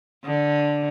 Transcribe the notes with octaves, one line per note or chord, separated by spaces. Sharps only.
D3